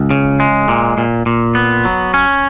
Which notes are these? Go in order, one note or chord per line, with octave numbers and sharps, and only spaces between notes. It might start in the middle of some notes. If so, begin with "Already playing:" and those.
Already playing: C#2
C#3
G#3
A#2
A#2
A#2
B3
F#3
C#4